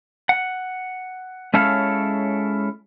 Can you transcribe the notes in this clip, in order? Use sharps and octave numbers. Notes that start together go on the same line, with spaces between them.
F#5
G#3 C#4 E4 A4 C#5 F5